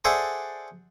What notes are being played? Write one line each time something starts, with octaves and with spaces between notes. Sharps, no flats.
G#4 A4 C5 D5 E5 F#5